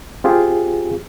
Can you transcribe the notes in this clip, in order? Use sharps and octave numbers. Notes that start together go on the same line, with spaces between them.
C4 F4 G4 G#4